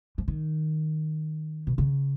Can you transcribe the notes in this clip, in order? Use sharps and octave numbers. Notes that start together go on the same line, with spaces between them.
F3
D#3
B2
C#3